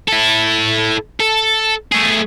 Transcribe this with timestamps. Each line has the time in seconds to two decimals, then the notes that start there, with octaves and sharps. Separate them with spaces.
0.08 E4 A4
1.20 A4
1.92 A3 G#4